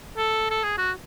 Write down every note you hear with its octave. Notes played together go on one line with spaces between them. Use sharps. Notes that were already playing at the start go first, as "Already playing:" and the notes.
A4
A4
G#4
F#4